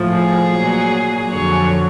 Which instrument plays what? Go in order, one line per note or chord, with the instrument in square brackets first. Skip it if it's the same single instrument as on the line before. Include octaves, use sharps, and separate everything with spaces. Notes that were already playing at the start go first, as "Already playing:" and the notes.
Already playing: [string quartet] A2 F3
G#4
A#2 F#3
F2 D3 F#3 C#5